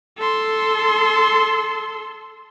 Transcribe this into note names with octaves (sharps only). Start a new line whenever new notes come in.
A4 C6